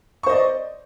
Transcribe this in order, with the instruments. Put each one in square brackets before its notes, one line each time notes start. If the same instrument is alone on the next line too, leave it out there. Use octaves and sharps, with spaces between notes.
[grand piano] C#6
C5
D#5
D5